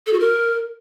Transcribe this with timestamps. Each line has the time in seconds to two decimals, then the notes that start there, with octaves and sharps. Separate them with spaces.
0.07 A4
0.13 F#4
0.20 A#4